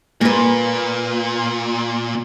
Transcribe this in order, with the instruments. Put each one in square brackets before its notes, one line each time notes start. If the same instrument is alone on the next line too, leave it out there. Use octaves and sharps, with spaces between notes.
[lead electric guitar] A#2 [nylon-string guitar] A#3 B4